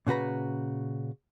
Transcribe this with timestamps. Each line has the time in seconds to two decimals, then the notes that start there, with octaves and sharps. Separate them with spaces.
0.07 A#2 C#3 F#4 B4 A#5